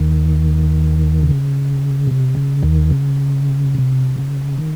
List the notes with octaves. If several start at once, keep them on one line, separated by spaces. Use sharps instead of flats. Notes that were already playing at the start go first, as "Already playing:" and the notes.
Already playing: D#2 D#3
C#3
C3
C#3
D#2 D#3
C#3
C3
C#3
D#3